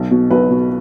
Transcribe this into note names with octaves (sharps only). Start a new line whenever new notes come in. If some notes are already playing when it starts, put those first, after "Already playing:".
Already playing: B1
B2
B1 B4
B2